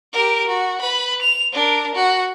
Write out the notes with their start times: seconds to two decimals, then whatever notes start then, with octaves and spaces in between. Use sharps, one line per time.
0.13 G4 A#4
0.47 F#4
0.81 B4 B5
1.22 F7
1.53 D4 A#4
1.95 F#4